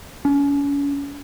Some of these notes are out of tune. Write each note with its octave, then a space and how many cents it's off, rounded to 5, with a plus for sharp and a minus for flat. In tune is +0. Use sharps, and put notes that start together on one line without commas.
C#4 +35